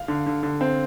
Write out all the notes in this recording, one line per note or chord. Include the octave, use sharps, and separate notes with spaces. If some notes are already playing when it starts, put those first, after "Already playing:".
Already playing: F5
D3
D3
D3
C4